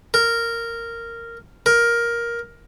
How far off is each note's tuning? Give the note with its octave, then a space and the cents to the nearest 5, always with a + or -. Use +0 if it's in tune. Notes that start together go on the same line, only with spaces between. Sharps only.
A#4 -10
A#4 +10